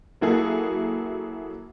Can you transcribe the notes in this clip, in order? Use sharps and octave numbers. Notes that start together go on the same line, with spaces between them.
F#3 A#3 E4 F#4 G#4 A4